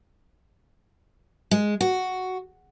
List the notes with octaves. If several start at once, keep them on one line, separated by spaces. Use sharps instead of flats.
G#3
F#4